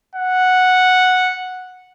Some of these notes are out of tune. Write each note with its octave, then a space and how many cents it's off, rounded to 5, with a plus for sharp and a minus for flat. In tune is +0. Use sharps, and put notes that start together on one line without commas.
F#5 -5